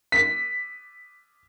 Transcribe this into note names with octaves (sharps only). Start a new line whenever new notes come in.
B6